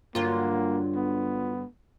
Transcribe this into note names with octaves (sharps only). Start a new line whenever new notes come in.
G2 D3 F#3 A#3 F4
B3